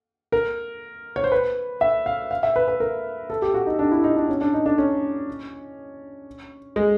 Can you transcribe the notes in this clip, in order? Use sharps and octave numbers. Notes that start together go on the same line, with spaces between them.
A#4
C#5
C5
B4
E5
F5
F5
E5
B4
B4
A#4
A4
G4
F#4
D#4
D4
E4
D#4
D4
C#4
D4
D#4
D4
C#4
G#3